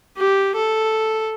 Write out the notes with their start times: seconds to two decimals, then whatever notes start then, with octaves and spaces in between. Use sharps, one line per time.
0.18 G4
0.55 A4